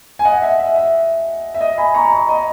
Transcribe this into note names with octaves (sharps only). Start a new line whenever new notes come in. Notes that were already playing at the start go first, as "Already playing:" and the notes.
G#5
D#5 F#5
E5
E5
E5
E5
D#5
G#5 B5
A#5 C#6
D#5
D#5